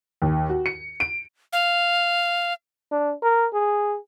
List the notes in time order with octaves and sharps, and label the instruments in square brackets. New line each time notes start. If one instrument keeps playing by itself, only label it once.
[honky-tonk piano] D#2
F#4
C#7
D7
[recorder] F5
[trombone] D4
A#4
G#4